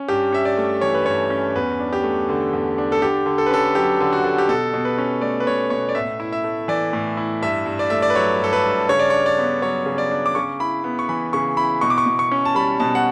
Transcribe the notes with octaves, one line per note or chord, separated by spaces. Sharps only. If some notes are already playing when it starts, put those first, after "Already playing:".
Already playing: C#4
G2 G4
C#4 E5
D5
A3
E3 C#5
B4
G2 C#5
C#4
E2 B4
D4
G4
A3
D3
E2
D4
A4
D3 G4
D3
A4
B4
C#4 A4
F#3 G4
D3
F#4
D3
G4
B2 A4
B2
B4
C#4
A3 D5
B4
B2 C#5
B2 C#5
D5
A2 E5
E4
E5
A3
E3 D5
A2
E4
G2 E5
G2
D5
A3 E5
D5
B4
F#3 C#5
G2 A4
B4
G2
C#3 C#5
D5
C#5
D4
D5
B3
F#3 C#5
C#3
D5
D4
D6
C#3 C#6
E4 B5
B3
C#6
E3 B5
C#3 C#6
E4 B5
B2 C#6
D6
C#6
B2
C#6
C#4
A5
G3 B5
B2 A5
F#5